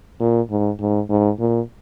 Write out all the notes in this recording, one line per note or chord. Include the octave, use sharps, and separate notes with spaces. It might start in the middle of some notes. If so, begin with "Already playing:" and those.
A#2
G#2
G#2
G#2
A#2